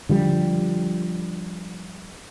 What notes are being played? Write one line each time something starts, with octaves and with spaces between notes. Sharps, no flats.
D3 F3 G3